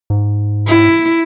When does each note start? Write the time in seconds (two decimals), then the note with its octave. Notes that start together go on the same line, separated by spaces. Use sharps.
0.10 G#2
0.67 E4